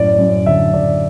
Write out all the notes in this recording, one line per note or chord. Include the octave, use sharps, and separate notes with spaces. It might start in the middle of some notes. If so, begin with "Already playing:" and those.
Already playing: F#2 A2 D5
F#2
D3 E5
D3 D5